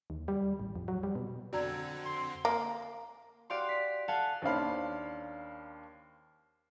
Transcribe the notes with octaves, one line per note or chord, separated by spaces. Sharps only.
D#2
G3
A1
F2
F#3
G3
B2
F2 D3 C4 F#4 D5 A#5 E6 G#6
C6
A#3
F#4 G4 D5 F5 G5 C6
B6
A4 F5 F#5 G#5 A5
D#2 C#4 D4 C5 F5 B5